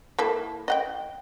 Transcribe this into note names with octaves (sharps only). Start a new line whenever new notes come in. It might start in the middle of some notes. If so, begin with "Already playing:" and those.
A#3 E4 A4
D#5 F#5 G5